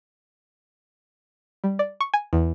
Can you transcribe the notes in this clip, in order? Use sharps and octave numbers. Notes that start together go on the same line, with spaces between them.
G3
D5
C#6
G#5
E2